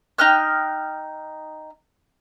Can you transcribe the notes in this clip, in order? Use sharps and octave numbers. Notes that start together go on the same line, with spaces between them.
D#4 G5 F6 F#6